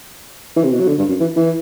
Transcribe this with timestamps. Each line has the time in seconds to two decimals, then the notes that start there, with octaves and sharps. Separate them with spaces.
0.56 E3
0.64 C3
0.72 B2
0.80 F#3
0.88 D3
0.98 G2
1.09 F#2
1.20 E3
1.36 E3